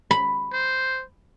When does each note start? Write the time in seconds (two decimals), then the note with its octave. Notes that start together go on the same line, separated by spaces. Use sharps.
0.11 B5
0.53 C5